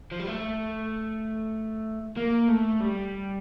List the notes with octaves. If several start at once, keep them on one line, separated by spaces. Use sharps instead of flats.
F3
G3
A3
A#3
A3
G3